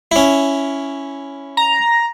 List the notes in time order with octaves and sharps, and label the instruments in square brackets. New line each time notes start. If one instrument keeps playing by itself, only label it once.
[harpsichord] C#4 E4
[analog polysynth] A#5